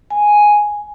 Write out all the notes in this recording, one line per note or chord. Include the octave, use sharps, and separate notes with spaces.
G#5